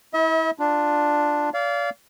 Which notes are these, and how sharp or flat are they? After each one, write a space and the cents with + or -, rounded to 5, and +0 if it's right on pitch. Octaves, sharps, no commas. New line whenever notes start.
E4 -25 E5 -45
D4 +5 F4 +0
D5 -35 F5 -10